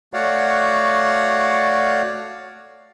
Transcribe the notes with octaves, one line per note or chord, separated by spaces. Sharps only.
A3 F#4 C#5 D5 F5 F#5